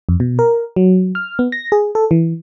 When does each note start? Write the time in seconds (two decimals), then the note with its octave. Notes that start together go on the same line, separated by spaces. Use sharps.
0.09 F2
0.20 B2
0.39 A#4
0.76 F#3
1.15 F6
1.39 B3
1.52 A#6
1.72 G#4
1.95 A4
2.11 E3